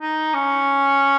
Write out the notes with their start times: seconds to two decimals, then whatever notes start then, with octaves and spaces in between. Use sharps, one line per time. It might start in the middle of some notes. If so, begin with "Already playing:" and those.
0.01 D#4
0.34 C#4